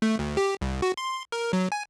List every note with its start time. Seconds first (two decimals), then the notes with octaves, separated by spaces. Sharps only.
0.02 A3
0.19 D2
0.37 G4
0.61 C2
0.82 F#4
0.97 C6
1.32 A#4
1.53 F#3
1.72 G#5